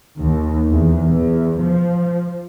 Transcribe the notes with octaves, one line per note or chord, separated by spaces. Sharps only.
D#2
E2
E2
F3